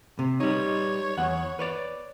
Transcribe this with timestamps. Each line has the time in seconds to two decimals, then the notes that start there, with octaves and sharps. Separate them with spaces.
0.19 C3
0.40 G3 D#4 C#5
1.17 E2 F#5
1.59 B4 C#5 D5